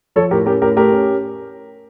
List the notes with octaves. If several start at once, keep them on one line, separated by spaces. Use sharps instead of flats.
F3 A4 C#5
A2 G4 A#4
C#4 G4 A#4
A2 G4 A#4
A3 G4 A#4
C#4